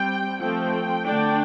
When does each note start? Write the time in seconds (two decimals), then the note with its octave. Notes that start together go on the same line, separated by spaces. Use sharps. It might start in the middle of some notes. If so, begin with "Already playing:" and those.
Already playing: G3 C4 G5
0.40 F3 A3 C4 G5
1.05 D3 A3 D4